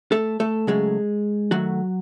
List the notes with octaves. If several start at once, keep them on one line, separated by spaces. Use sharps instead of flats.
A3 A4
A3 A4
C#3 F#3 G#3 A3 G#4
D#3 F#3 A3 F#4